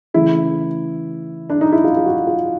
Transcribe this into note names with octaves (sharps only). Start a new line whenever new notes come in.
C#3 E3 A3 E4
D4
D#4
E4
F4
F4
F#4
F4